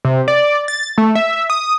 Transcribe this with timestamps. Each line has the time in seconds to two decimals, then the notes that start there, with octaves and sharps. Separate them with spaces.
0.05 C3
0.28 D5
0.68 A6
0.98 A3
1.15 E5
1.50 D#6